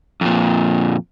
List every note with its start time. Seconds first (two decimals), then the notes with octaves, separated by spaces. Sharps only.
0.21 F2 A#2